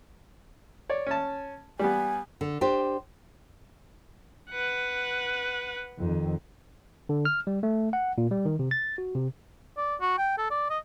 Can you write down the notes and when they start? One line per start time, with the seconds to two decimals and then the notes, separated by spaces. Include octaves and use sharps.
0.89 C#5 D5
1.07 C#4 A5
1.79 G3 B3 G#5
2.41 D3
2.61 D4 G4 C5
4.50 B4 F#5
5.98 F2 D#3
7.09 D3
7.25 F6
7.47 G3
7.63 A3
7.93 F#5
8.18 A#2
8.31 G3
8.45 D#3
8.59 C3
8.71 A6
8.98 F#4
9.15 C3
9.77 D5
10.01 F#4
10.18 G5
10.38 A4
10.50 D5
10.70 D#5